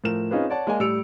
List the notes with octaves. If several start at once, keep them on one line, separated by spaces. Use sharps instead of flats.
A2 F3 A#4 E7
C4 C#4 D#4 F4 G#4 B4
C#5 D5 F#5 A5
G#3 A#3 A#4 D5 G#5
A2 G3 E6 C#7 D7 F7